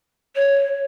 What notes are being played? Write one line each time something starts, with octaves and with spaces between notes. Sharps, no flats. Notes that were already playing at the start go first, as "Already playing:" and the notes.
C#5